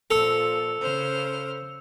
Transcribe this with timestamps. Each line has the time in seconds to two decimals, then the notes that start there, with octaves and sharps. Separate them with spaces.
0.10 A#2 F3 A4 E6 C#7 F7
0.80 C#3 C5 F6